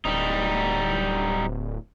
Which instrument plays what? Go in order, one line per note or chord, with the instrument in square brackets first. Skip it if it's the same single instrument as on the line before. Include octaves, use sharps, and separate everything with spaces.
[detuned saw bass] D1 [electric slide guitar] G3 D#4